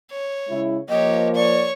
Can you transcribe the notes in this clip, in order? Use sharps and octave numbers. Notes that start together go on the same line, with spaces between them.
C#5
C#3 G#3 E4
F3 A#3 G4 C#5 D#5
C#5 D5 C#6